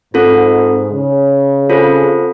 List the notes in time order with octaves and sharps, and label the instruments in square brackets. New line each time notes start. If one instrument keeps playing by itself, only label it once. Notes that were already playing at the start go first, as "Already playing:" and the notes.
[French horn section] G#2 [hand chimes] C4 F4 A4
[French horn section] C#3
[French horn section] C#3 [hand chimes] C4 F4 A4 C5